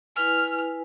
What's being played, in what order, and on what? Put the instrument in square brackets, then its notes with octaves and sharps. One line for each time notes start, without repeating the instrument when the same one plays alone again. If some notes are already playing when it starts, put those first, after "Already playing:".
[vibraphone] E4 B4 G#5 [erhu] F6